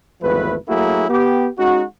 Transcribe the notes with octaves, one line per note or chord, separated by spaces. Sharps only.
G#1 E2 F3 A3 B4
F#3 A3 A#3 E4 F#4 G#4
B3 G4
G#3 C#4 D#4 F#4